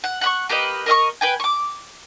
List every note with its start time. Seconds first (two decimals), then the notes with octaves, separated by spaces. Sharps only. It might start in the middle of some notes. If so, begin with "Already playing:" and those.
0.04 F#5
0.21 F#5 B5 C#6
0.49 A#3 G4 B4 D#5
0.86 A#4 D#5 E5 C#6
1.21 B4 G5 G#5
1.40 C#6 D6